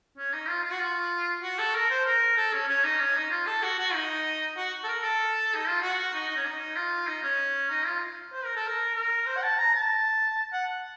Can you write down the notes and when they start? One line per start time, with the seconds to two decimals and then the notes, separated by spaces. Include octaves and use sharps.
0.18 C#4
0.33 D#4
0.49 F4
0.64 F4
0.72 F#4
0.80 F4
1.43 F#4
1.58 A4
1.74 A#4
1.90 C5
2.06 A#4
2.37 A4
2.53 C#4
2.68 C#4
2.84 D#4
3.00 C#4
3.16 D#4
3.31 F4
3.46 A4
3.63 F#4
3.79 F#4
3.94 D#4
4.57 F#4
4.84 A4
4.88 A#4
5.03 A4
5.54 D#4
5.68 F4
5.82 F#4
6.13 D#4
6.29 D#4
6.36 C#4
6.45 D#4
6.76 F4
7.07 D#4
7.23 C#4
7.70 D#4
7.86 F4
8.33 C5
8.44 A#4
8.56 A4
8.67 A#4
8.95 A#4
9.26 C5
9.36 F#5
9.42 A5
9.58 A#5
9.74 A5
10.53 F#5